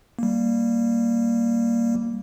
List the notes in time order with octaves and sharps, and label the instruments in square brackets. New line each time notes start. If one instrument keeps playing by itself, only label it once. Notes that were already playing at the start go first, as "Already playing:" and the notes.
[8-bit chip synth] G3 A#3